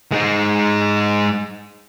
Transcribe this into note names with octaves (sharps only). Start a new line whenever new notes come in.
G#3 D#4